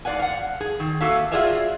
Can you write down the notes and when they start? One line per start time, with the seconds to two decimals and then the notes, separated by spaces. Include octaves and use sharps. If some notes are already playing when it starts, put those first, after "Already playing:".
0.05 G#2 D5 F5 F#5 G#5
0.19 F5 F#5
0.60 G#4
0.80 D#3
1.01 A#3 F#4 A4 E5 F5
1.32 F4 F#4 G#4 D5 E5 F5